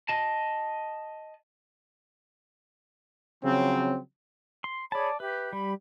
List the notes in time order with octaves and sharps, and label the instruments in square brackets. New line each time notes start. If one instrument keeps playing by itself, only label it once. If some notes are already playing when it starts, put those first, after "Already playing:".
[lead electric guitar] D#5 A5
[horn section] C#3 F3 F#3 C4
[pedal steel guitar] C6
[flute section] G#4 C#5 B5 [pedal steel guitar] D5 A5
[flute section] G4 E5 [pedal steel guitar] B4
[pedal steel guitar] G3 [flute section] B5